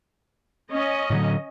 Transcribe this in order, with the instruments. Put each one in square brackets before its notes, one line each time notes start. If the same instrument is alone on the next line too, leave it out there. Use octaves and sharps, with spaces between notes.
[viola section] C#4 D#5
[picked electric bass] A2 D3 F#3